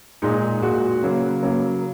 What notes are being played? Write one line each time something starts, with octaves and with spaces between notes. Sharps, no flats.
A#2 G#3 D#4
A#2 G#3 F#4
C#3 F#3 A#3
C#3 F#3 A#3